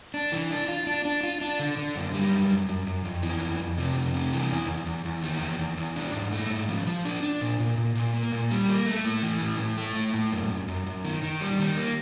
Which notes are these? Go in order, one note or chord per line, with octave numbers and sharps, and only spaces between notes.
D4
E3
D4
F4
D4
D4
F4
D4
D3
D3
F#2
G3
F#2
F#2
F#2
F#2
F2
E3
F2
F2
C3
F2
C3
E3
E2
E2
E2
E2
D#3
E2
E2
E2
D4
G#2
A3
G#2
F3
F3
D4
D4
A#2
A#2
A#2
A#2
A#3
A#2
G3
A#3
A3
A2
E3
A2
A2
A3
A2
A2
F#2
F#2
F#2
F#2
D#3
D#3
G3
D#3
A#3